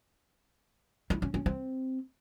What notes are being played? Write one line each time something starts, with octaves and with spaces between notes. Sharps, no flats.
E4
C#4
C#4
C4